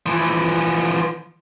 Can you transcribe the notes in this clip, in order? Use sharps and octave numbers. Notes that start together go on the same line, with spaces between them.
E3 F3